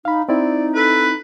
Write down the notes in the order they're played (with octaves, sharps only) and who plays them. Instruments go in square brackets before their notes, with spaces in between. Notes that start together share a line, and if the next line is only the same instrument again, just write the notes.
[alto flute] D#4 [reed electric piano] F5 B5
[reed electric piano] C4 E4 [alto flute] D#4 [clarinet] D5
[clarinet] A4 [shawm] B4